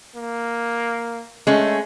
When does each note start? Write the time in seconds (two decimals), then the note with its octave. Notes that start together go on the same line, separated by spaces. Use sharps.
0.15 A#3
1.47 G#3 A3 C#4